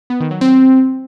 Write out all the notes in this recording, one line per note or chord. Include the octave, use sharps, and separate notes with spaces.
B3
D#3
F#3
C4